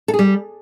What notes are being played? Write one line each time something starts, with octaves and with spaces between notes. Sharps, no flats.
A4
G#4
G3